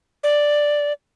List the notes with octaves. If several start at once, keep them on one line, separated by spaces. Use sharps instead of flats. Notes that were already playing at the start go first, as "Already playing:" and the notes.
D5